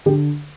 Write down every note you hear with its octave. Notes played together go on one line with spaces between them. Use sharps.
D3 G4